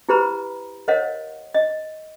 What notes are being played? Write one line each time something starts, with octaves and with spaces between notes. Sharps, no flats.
E4 G4 B4 C5 A#5 B5
A#4 C5 C#5 D#5 F5 F#5
D#5